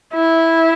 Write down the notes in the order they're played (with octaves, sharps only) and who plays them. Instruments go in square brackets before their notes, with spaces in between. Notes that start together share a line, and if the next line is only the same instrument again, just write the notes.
[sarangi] E4